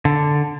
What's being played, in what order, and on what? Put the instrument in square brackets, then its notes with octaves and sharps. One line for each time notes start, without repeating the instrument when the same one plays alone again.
[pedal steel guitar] D3